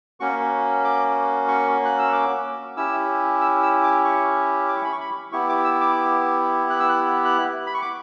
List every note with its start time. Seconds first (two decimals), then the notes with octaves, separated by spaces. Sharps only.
0.20 A#3 C#4 F#4 C#6
0.84 D6
1.48 C#6
1.85 F#6
1.99 E6
2.13 D6
2.76 C#4 E4 G4 E6
3.41 E6
3.63 E6
3.83 D6
4.05 C#6
4.69 D6
4.76 C#6
4.84 B5
4.92 C#6
5.01 B5
5.32 B3 E4 G4 C#6
5.49 D6
5.64 E6
5.81 D6
6.70 F#6
6.80 E6
6.89 F#6
7.25 F#6
7.67 B5
7.74 C#6
7.82 D6